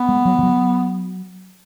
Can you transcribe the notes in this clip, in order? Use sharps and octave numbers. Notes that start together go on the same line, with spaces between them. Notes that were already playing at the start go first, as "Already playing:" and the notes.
Already playing: B3
G#3
F#3
E3
F#3